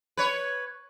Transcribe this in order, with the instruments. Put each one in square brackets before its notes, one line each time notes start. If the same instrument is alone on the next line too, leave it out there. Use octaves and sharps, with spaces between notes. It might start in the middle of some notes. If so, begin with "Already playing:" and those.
[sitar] B4 C#5